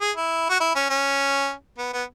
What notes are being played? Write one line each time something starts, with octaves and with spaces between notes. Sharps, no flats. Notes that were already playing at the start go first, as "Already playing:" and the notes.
G#4
E4
F#4
E4
C#4
C#4
B3
B3